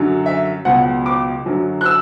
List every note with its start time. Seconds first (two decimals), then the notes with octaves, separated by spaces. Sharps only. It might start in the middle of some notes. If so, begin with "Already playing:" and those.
Already playing: F#2 D3 F#3
0.26 E5
0.65 C#2 B2 F#3 F#5
1.06 D6
1.46 F#2 D3 F#3
1.81 F#6
1.86 E6